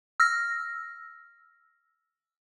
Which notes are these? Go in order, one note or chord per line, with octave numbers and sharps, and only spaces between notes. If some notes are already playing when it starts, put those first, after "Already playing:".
E6 F6 A#6